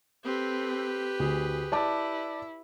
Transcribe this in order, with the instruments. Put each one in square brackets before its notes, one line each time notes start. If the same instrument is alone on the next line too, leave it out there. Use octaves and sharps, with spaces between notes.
[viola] C4 A4 [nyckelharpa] G4 B4
[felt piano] D2 [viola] G#4
[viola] E4 [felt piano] D5 A5 D6